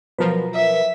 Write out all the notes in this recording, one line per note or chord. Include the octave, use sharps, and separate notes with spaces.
B2 F3 F#3 A#4 B4
E5